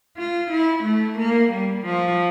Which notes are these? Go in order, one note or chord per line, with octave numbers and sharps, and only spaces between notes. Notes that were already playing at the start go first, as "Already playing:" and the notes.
F4
E4
A3
A#3
G3
F3